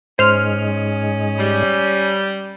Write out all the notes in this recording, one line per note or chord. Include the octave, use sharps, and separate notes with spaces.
G#2 G#3 C#4 C5 F6
G3